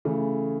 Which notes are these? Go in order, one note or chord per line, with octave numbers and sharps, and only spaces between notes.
C#3 E3 A3